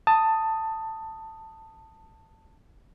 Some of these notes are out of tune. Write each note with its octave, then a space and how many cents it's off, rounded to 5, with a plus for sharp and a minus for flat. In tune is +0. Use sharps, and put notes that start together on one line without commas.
A5 +15 D#6 +0